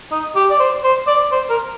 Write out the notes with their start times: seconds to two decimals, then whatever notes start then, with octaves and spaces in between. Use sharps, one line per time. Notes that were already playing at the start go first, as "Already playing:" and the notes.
0.11 D#4
0.36 G4
0.50 D5
0.60 C5
0.83 C5
1.07 D5
1.32 C5
1.50 A#4